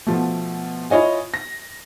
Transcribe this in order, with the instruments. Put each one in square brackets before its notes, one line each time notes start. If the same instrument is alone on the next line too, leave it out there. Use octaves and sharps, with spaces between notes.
[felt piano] B2 F3 A3
E4 F4 C#5 D#5 G#5
A#6